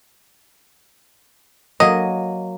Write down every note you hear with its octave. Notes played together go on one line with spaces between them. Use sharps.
F#3 A#3 D#5